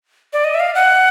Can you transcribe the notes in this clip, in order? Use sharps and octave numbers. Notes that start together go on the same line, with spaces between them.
D5
D#5
E5
F5
F#5